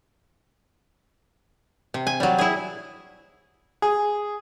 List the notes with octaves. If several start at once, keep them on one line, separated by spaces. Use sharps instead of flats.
C3
G#5
F#3 G3
E4 G#4
G#4